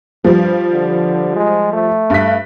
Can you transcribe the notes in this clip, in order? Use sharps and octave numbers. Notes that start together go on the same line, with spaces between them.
G2 F3 G3
D3
G#3
A3
G2 B6